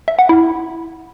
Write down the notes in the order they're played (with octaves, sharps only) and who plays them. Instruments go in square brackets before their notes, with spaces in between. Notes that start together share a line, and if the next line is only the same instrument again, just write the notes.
[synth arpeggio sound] E5
F#5
E4